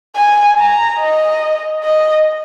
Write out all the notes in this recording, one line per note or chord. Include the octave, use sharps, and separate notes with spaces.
G#5
A#5
D#5
D#5